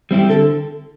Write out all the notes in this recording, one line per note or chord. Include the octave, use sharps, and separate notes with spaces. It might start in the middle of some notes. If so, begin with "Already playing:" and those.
G3 C4 E4 G4
D3 A4